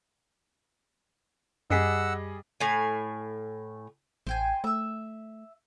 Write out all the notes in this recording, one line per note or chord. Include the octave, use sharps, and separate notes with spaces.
F#2 G3 G#4 D#5 F#5 E6 B6 C7
A2 G#5
A1 C5 G5 G#5
A3 E5 E6